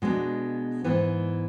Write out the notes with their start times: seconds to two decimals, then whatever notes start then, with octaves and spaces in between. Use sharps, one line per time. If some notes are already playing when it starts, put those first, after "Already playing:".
0.02 B2 G#3 B3 D4
0.84 G#2 E3 B3